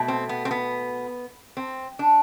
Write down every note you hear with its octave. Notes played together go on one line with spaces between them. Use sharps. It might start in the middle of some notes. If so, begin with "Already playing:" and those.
Already playing: B2 A3
C4
B3
C4
B3
C4
D4